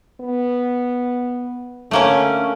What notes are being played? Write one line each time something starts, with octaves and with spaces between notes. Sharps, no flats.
B3
D3 A3 A#3 C#4